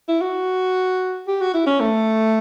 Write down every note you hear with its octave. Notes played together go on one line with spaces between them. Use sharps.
E4
F#4
G4
F#4
E4
C#4
A3